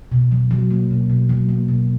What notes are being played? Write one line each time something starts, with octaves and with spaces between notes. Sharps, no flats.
B2
F#3
F#3
A#3
B2
B2
F#3
A#3
B2